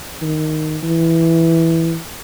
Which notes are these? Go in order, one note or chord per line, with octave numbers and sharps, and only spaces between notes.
D#3
E3